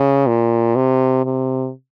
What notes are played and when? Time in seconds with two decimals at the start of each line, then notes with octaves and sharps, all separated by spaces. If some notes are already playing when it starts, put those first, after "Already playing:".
Already playing: C#3
0.27 A#2
0.76 C3
1.25 C3